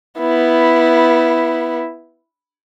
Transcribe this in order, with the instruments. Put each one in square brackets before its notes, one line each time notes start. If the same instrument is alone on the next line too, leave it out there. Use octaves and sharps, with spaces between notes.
[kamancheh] B3 E4